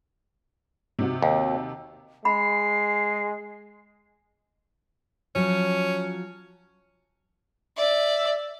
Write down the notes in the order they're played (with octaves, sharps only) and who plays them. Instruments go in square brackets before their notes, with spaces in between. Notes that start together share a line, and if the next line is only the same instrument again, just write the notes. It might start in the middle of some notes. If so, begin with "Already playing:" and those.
[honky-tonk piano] C3 D#4 F#4
[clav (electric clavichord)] D#2
[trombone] G#3 [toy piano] B5 [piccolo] C7
[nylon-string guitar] F3 F#3 [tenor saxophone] C#4
[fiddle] D5 [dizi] E5